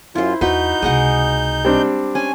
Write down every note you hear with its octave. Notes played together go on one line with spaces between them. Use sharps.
F#2 E4 F4 C5
E2 D#4 F#4 B4 G6
C#2 C3 G#3 D#5 F#5
G3 C4 D4
C#4 G#5